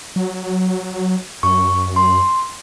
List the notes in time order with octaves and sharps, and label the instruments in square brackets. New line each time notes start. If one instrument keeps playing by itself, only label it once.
[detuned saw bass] F#3
[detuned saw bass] F#2 [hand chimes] C#6
[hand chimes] C6